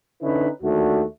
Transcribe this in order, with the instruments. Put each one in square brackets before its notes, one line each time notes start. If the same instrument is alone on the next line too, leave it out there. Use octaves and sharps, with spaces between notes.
[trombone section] D3 C#4 D#4 E4 B4
D#2 A3 D4 F#4